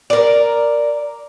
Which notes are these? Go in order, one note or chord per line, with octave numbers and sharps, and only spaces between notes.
A#4 D5